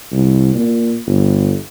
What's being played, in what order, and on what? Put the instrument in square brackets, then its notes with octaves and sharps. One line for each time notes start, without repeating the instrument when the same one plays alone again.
[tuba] C2
A#2
G1